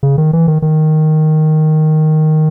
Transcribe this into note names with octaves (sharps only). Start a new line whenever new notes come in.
C#3
D#3
E3
D#3
D#3